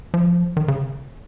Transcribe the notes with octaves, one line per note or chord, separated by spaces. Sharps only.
F3
D#3
C#3